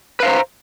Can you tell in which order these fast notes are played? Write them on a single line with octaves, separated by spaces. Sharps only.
B4 F5 C5 A#5